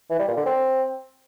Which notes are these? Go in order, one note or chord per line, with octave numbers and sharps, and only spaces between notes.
E3
G3
A#2
D3
C4